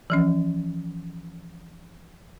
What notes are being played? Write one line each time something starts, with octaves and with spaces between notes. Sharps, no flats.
E3 F3 C#4